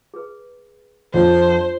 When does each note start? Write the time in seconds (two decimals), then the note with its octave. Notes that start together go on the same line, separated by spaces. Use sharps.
0.14 G#4 B4
1.14 F2 D4 F4 C5 C#5